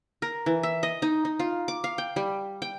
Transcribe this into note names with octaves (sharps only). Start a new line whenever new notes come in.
A#4
E3
E5
D#5
D#4
D#4
F4
D6
F5
G5
G3
G5